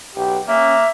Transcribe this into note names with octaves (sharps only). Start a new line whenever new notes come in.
B1 G4
A#3 C#4 E5